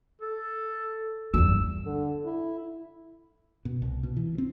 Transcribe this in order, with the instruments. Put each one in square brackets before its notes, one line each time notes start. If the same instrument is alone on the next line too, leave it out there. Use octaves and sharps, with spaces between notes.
[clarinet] A4
[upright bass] E2 G2 [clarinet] E6
[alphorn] D3
E4
[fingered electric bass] B2
C2
B2
E3
C4